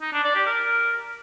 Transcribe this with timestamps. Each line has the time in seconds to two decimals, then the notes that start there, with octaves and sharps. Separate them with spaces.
0.01 D#4
0.12 D4
0.24 D5
0.35 G4
0.46 A#4